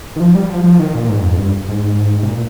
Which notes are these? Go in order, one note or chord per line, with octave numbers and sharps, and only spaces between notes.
D#3
F3
G3
F3
F3
D#3
A#2
G#2
G2
F2
G2
G#2
C3
A#2